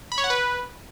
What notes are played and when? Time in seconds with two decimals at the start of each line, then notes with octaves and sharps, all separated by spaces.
0.12 B5
0.18 C#5
0.24 F#5
0.30 B4